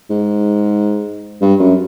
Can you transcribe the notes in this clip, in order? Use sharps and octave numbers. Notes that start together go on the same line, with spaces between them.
G#2
G2
F#2